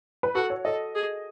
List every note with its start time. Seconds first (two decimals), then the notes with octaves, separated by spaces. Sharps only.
0.23 B4
0.35 F#4 A4
0.50 C#5
0.65 A4 D#5
0.95 G#4